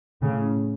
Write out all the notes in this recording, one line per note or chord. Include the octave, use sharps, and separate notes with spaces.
A2 C#3